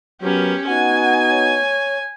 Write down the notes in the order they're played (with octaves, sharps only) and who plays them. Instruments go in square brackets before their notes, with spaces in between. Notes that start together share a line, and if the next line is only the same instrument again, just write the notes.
[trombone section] F#3 B3 A#4 [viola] C#4 G4
[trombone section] B3 D#4 F#4 [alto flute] F#5 [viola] G#5
[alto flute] C#5